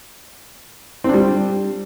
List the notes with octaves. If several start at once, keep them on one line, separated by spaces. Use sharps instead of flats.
G3 C4 D4